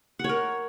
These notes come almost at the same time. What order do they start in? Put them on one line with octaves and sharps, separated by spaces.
F#5 C#5 A#4